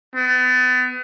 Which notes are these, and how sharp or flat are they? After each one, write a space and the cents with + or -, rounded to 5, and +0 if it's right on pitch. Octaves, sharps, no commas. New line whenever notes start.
B3 +35